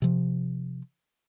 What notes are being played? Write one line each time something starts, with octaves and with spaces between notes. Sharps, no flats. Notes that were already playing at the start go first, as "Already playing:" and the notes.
C3 F3